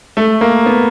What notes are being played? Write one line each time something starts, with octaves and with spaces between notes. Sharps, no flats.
A3
A#3
B3